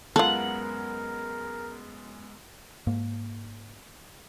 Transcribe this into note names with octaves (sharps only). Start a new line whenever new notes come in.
F#2 G#3 B3 F4 A4 A#4 F#5
G#2 A#3